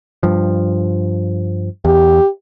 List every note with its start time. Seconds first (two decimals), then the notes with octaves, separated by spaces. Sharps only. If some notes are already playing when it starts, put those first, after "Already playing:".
0.23 G2 F3
1.85 E2 G4